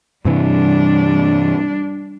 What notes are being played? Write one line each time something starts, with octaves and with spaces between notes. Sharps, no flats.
G2 C3 E3 G3 D4